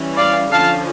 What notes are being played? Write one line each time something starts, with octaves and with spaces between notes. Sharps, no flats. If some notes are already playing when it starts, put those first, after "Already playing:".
Already playing: E3 G3 C#4
D5 F5
D3 F3 C#4 F5 A5